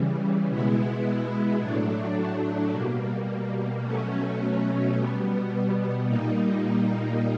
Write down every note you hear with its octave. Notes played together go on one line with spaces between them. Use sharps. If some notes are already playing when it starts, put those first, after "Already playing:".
Already playing: C#3 E3 G3
B2 G#3 B3 E4
A2 F#3 A3 D4
B2 G3 A#3
B2 F#3 A3 C#4
B2 G3 B3
A#2 G3 A#3 D#4